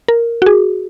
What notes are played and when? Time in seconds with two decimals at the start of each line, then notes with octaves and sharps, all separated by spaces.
0.08 A#4
0.42 F#4
0.46 G#4